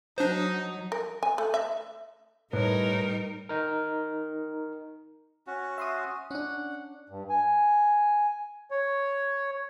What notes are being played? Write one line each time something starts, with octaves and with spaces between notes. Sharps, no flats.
F#3 D4 D#4 C5
A#4
G#5
A3
E5
A2 G3 D#4 A#4 B4 C#5
D#4 A#4
C#4 F#4
E5 C6 D#6
C#4 D4 F#5
G2
G#5
C#5